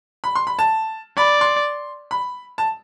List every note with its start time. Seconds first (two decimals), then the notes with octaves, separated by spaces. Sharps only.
0.24 B5
0.35 C6
0.47 B5
0.59 A5
1.17 D5 B5
1.41 C6
2.11 B5
2.58 A5